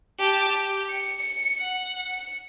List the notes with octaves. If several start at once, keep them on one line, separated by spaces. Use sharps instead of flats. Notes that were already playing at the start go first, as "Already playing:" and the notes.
G4 A5
G4
C#7
C#7
F#5
C#7